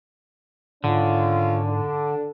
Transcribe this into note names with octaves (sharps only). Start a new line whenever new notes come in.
G#2 D3 D#3 C#4 F4
D4 A4